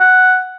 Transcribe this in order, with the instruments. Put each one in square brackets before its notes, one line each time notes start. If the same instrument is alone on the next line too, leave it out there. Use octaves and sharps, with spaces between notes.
[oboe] F#5